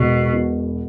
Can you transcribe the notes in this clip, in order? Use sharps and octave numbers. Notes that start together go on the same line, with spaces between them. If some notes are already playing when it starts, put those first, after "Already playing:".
Already playing: E1 B2
B2